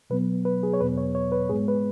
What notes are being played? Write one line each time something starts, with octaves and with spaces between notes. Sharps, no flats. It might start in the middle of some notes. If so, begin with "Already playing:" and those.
B2 F#3 B3 B4
B4
G#4
C#5
E2 B2 F#3 B3 B4
C#5
C#5
B4
G#2 G#3 B3 G#4
B4